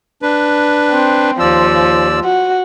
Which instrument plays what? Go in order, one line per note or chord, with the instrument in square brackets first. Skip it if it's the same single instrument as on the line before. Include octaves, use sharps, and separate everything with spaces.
[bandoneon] D4 B4
[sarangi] C4
[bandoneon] D#2 D5 E6 [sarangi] F3
[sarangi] F#4